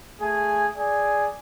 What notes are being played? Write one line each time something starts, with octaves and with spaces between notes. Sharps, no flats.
A3 G#4 G#5
G#4 D5 G#5